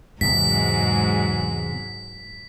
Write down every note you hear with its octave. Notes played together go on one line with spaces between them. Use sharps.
E2 G#2 C3 F#3 G#3 B6